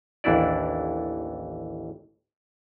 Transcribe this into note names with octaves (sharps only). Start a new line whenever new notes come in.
A1 D#2 E3 D4 E4 D5